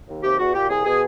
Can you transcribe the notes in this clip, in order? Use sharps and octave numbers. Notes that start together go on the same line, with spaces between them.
D#2
C3 G4
E2 F#4
A#2 G4
C2 G#4
B2 G#4